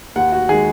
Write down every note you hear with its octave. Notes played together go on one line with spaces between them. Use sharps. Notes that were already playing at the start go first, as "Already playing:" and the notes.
D#2 F#5
F#4
D#3 G#3 G#4